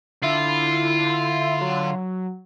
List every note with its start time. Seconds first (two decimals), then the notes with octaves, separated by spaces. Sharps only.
0.23 D3 E4 F4
1.61 F#3